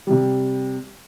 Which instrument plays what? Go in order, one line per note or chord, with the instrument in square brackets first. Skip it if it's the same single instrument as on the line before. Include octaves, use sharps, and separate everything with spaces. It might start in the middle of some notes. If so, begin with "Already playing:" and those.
[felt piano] C3 G3